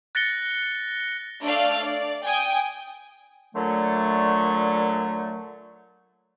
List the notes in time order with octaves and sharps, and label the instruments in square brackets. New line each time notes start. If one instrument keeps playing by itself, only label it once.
[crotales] F#6 A6 A#6 C#7 G7
[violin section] A3 D4 A4 D5 F5
D5
G5 G#5 D#6
[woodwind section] A#2 D3 F#3 A3